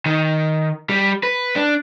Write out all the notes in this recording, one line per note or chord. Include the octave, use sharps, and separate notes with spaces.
D#3
G3
B4
D4